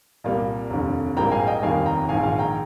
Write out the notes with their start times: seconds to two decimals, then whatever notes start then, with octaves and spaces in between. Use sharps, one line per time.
0.24 C2 A#2 G3 A#3
0.70 F1 D#2 D3
1.16 A#1 G#2 G3 A#3 G5 A#5
1.31 F5 G#5
1.47 D#5 G5
1.62 F1 D#2 D#3 G3 A#3 F5 G#5
1.85 G5 A#5
2.09 A#1 G#2 D#3 F5 G#5
2.23 F5 G#5
2.38 G5 A#5